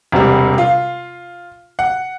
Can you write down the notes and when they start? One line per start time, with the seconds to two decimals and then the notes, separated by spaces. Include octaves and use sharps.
0.12 E1 C3 G3
0.58 F4
1.79 F#5